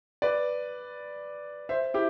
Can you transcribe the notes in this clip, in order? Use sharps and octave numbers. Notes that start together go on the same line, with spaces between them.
B4 D5
C5 E5
E4 G4